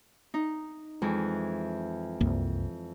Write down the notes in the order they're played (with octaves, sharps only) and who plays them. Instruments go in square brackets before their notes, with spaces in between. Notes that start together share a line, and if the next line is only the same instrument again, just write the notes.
[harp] D#4
F2 E3 G#3
[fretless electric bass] C2 F#2 A#3